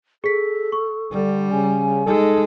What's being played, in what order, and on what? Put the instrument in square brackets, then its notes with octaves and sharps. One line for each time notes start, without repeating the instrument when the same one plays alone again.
[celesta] G#4 B6 [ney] A4
[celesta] C#6
[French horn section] D3 [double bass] G3
[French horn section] C#3 [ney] G#5
[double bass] G#3 [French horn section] D#4 A4